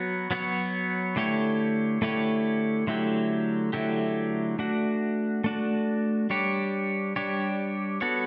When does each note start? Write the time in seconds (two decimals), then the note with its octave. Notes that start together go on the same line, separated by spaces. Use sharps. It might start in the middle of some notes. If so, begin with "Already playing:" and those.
Already playing: F#3 B3 F#4 C#5
0.31 F#3 B3 F#4 C#5
1.16 D3 A3 E4 G4 C#5
2.02 D3 A3 E4 G4 C#5
2.87 D3 F#3 A3 E4 G4
3.73 D3 F#3 A3 E4 G4
4.59 A3 D4 F#4
5.44 A3 D4 F#4
6.30 G3 D4 G4 C#5
7.16 G3 D4 G4 C#5
8.01 B3 F#4 A4 C#5